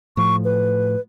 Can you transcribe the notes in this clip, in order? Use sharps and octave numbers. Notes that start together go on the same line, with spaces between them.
A2 F3 C#6
B4